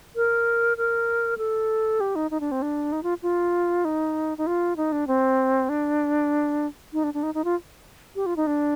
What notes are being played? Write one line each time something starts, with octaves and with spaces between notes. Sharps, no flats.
A#4
A#4
A4
G4
D#4
D#4
D4
C4
D4
D#4
F4
F4
D#4
D#4
F4
D#4
D4
C4
D4
D#4
D4
D4
D#4
D#4
F4
G4
F4
D#4
D4